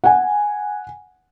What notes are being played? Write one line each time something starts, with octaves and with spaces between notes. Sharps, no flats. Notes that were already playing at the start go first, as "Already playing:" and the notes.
F#5 G#5